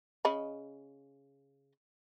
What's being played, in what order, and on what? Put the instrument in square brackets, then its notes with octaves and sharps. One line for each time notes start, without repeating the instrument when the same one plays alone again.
[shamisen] C#3 D#5 B5